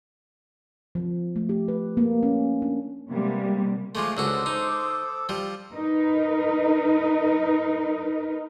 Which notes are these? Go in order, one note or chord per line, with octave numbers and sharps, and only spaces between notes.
F3
A3
G4
B4
A#3
C#4
D4
C3 G3 G#3 A#3 B3
F3 G#3 A3 F5 C6 D6
C#2 D3 F#4 A4 C5 D6 D#6
D#4
F3 G3
D#4 A#4 B4